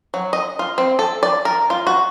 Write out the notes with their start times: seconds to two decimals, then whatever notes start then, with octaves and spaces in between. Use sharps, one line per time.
0.14 F#3
0.33 D#5
0.59 F4
0.78 C4
0.99 A4
1.23 D5
1.45 A#4
1.70 F4
1.87 F#4